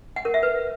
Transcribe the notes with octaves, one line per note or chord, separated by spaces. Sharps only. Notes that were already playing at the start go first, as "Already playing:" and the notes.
F#5
A#4
E5
B4